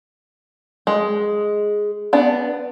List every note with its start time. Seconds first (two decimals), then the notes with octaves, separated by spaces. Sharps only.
0.87 G#3
2.13 B3 D4